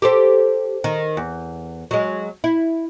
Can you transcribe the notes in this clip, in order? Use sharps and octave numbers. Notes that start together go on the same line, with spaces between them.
G4 A4 C5
D#3
E2
F#3 G#3
E4